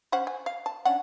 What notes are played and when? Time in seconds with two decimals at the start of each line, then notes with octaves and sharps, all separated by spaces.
0.12 C#4 C5 F#5
0.27 G#5
0.46 F5
0.66 A5
0.85 C#4 D4 F#5